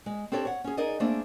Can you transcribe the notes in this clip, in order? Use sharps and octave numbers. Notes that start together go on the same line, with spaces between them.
G#3
C4 D4 G4 A4 C#5 G5
C#5 F#5
C#4 G#4
D#4 G#4 A#4 D5 D#5
A3 A#3 C4 D4 G#4